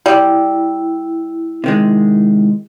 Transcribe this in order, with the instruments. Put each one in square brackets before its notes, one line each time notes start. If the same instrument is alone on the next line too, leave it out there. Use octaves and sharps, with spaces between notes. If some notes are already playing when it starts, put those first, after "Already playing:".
[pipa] G3 [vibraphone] E4
[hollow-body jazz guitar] C3 D#3 G#3